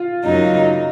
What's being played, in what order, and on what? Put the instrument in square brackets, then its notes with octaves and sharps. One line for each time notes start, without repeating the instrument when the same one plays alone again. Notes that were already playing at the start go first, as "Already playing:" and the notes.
Already playing: [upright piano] F4
[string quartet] F#2 C#3 F#3 A#3 D#4